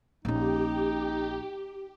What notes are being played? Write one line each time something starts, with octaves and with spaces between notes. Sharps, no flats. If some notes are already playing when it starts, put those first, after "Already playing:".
A#1 C#4 D#4 G4